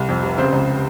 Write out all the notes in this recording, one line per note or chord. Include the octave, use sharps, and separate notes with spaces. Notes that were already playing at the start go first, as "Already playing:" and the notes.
Already playing: C2
F2
F1
C#3 C4 C5
C#2